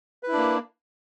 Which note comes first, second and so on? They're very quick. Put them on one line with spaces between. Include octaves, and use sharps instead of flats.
B4 E4 D4 A#3